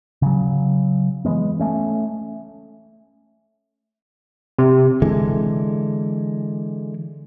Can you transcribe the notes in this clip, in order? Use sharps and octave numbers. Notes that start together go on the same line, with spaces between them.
C#3 F#3
E3 F3 G#3 B3
A3 C#4
C3
D3 E3 G#3